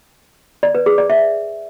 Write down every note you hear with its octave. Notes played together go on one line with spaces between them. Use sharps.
D5
B4
G#4
D5
E5